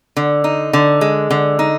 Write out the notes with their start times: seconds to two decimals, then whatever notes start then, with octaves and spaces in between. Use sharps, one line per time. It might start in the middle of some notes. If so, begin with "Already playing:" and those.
0.17 D3
0.44 D#4
0.73 D3
1.01 G#3
1.31 D3
1.59 D#4